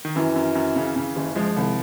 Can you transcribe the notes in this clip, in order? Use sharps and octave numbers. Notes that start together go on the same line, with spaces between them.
D#3
F#2 E3
F#2
F#2
C#3
C#3
F#1
F3 G#3
C2